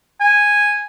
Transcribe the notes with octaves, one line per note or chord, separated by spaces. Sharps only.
G#5